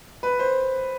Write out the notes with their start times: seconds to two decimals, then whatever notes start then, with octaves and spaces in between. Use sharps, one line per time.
0.23 B4
0.39 C5